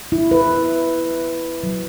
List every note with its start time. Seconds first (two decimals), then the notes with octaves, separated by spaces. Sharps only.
0.12 E4
0.31 B4
1.63 F#3